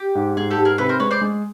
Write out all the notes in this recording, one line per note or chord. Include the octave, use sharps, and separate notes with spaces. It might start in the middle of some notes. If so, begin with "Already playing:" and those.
Already playing: G4
G#2
G#2 G#4
G4 A4
G#2
G#4 A#4
C3 A4 B4
A#4 C5
G#3 B4 C#5
C5 D5
G#3